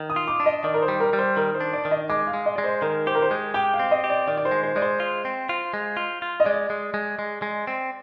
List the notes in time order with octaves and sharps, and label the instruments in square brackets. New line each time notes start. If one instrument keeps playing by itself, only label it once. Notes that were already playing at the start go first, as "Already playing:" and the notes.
Already playing: [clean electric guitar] D#3
[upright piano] D#6
[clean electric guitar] F4
[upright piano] D6
[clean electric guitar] D4
[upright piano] D#5
[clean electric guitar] D#3 [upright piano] D5
[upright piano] A#4
C5
[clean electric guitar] G3
[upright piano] A#4
[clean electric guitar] G3
[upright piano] C5
[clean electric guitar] D#3 [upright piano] A#4
[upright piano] C5
[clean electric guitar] D4
[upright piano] D5
[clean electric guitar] D#3
[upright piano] D#5
[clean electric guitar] G#3 [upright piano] D6
[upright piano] F5
[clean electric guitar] G#3
[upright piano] D#5
[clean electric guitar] G#3 [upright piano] D5
[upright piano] C5
[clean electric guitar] D#3 [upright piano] A#4
[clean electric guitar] G4 [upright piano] C5
[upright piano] A#4
C5
[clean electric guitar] G#3
[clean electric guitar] G4 [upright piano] G5
[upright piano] F5
[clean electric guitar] C4
[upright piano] D#5
[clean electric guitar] G4
[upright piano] D5
[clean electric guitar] D#3 [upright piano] D5
[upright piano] D5
C5
[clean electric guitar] G#3
[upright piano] C5
[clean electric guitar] G#3 [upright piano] D5
[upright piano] C5
[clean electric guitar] F4
C4
F4
G#3
F4
F4
[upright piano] D#5
[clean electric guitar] G#3 [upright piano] D5
[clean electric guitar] G#3
G#3
G#3
G#3
C4